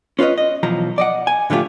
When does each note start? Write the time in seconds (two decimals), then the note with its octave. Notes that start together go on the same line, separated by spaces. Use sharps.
0.19 C#4 F4 B4 C#5 D#5
0.38 D#5
0.63 B1 E3 F3 A#5
0.98 D5 D#5 F#5
1.27 G#5
1.50 A2 D3 F3 A3 F4 G4